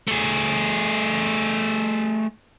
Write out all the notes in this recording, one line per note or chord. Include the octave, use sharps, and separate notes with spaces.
A3 G#4